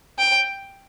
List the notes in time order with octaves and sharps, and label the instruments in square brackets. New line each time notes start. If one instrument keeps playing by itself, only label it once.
[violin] G5